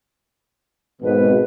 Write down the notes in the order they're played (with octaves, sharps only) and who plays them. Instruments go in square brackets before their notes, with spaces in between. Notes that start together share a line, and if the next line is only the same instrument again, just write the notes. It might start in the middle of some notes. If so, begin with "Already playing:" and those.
[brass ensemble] G#1 B2 [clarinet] B4